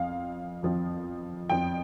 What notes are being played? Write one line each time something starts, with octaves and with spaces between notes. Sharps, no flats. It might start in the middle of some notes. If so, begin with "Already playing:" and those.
Already playing: F2 F3 C4 F5
F2 F3 C4
F2 F3 C4 G5